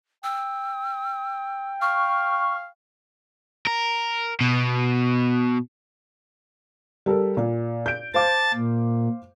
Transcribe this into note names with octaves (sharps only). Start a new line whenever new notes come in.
G5 E6
F5 C#6 F6
A#4
B2
G3 A4 A#4
A#2
G6 D7
C5 F5 A5 D6 A6
A#2